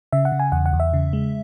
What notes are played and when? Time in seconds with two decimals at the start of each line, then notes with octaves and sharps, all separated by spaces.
0.12 C#3 E5
0.25 F#5
0.32 C#3
0.40 G#5
0.52 E2 F#5
0.66 F#5
0.73 E2
0.80 E5
0.93 C#3
1.13 G#3